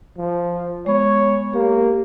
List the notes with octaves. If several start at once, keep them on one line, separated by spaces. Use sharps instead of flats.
F3
G#3 B3 C#5
A#3 G4